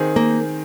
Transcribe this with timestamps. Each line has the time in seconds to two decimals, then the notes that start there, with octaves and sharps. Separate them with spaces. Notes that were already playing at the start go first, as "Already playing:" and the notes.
Already playing: D#3 C4 G#4
0.16 A#3